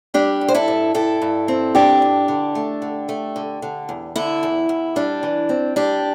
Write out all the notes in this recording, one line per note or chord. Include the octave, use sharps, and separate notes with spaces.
G3 D4 G4
G2
C5
E4 A4
G2
G2 E4 A4
G2
C4
G2 D4 G4
G2
D3
A3
D3
A3
D3
D3
E2
D3 E4
E2
E2
G3 D4
E3
C4
G3 D4 G4